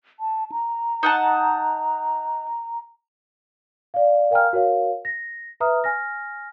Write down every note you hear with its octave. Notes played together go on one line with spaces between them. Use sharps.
A5
A#5
D#4 F#5 A5
D5 F5
A#4 F5 G5 G#5 A#5 F6
F#4 A#4 C#5 F5
A#6
B4 E5 A#5 D#6 F6
G#5 F6 A#6